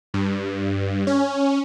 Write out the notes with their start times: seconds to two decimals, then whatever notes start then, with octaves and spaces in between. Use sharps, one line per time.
0.14 G2
1.07 C#4